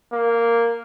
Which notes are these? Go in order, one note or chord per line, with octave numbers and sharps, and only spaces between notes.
A#3